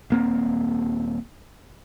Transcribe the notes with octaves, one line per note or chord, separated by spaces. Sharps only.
D#1 A#3 C4